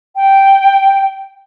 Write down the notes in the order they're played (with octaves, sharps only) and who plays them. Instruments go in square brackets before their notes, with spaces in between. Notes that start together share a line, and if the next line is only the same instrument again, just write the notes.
[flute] G5